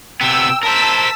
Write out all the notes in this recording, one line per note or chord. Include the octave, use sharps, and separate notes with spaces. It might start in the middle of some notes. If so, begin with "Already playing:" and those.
C3 B3 G5 E6
A#4 C5 A5 E6 B6